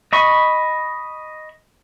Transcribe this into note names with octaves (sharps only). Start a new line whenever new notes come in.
D#5 B5 C#6